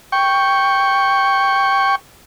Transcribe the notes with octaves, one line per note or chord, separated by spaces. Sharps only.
G5 C#6